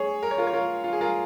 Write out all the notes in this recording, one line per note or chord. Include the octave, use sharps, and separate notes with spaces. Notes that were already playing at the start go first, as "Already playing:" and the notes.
Already playing: G#4 C#5
A#4
C#5
F4 A#4
C#5
F4 A#4
F4
G#4
F4 A#4